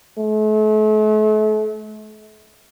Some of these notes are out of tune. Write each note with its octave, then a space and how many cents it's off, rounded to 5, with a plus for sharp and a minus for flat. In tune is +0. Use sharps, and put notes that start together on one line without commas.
A3 -40